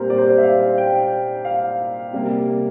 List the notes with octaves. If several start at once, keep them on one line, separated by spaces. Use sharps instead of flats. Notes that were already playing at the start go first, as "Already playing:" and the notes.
Already playing: A#2 G3 C4 G4 A#4 C5
D5
C5
D5
E5
F5
G5
F5
C3 G3 A#3